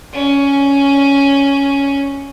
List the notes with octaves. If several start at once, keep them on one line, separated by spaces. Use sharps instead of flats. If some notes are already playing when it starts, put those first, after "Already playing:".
C#4